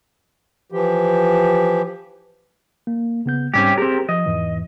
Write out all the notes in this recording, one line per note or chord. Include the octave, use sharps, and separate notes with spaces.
E3 F3 G4
A#3
C#3 B3 G6
G#2 G3 C4 C#4 G4
C4 G4 G#4 A#4
F3 D#5
E2 G#2 E3